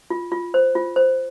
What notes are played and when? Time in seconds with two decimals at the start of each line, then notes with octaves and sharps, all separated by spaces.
0.10 F4
0.32 F4
0.54 C5
0.75 F4
0.96 C5